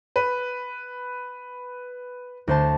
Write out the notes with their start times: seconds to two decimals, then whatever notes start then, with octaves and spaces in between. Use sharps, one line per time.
0.16 B4
2.48 D2 C5 A5